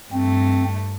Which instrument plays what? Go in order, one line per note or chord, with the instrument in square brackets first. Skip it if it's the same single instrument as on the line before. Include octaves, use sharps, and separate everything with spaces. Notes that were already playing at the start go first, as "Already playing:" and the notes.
[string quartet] G2 A3 [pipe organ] C4